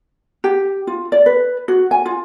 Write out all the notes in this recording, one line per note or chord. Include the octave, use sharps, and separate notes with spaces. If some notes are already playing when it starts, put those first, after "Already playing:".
G4
F4
D5
B4
F#4
G#5
F4